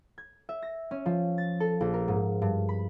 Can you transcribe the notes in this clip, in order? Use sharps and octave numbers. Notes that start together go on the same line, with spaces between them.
G#6
E5
A#6
C#4
F3
A6
A4
A#1
A#4
G#2
G2
B5